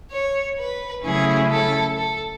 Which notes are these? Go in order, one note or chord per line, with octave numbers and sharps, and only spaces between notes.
C#5
B4
C#3 F#3 A3 C#4 E4 G#4
A4
A4